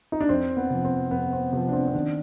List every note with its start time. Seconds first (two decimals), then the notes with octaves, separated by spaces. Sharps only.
0.12 D#4
0.21 D4
0.29 F2 C4
0.57 B3
0.70 C3 F3
0.85 C4
1.11 F2 B3
1.32 C4
1.53 C3 F3 B3
1.69 D4
1.73 C4
1.88 C4
1.94 D#3 D4